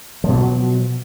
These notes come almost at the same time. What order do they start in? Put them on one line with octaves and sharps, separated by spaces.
F3 B2 F#3